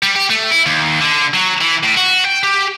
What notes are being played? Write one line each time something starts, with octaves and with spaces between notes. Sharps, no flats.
G3
G4
A3
E4
D#2
D3
F#3
E3
A2
F#4
G5
G4